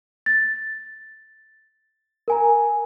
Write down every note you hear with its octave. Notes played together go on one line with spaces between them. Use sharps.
A6
A#4 G#5 A#5